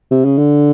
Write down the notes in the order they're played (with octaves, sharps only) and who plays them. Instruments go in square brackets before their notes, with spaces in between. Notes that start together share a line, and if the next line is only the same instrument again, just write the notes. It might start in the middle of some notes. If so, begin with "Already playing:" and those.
[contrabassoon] C3
C#3
D3